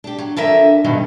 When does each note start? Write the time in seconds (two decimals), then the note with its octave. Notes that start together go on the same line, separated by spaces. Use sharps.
0.04 D4 G4
0.18 F#3
0.36 F2 D3 A#4 E5
0.84 G2 B2 D#3 F#3